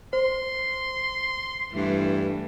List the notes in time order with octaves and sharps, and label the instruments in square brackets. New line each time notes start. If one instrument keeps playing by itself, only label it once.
[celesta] C5 [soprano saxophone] C6
[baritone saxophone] G2 [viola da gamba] E3 A3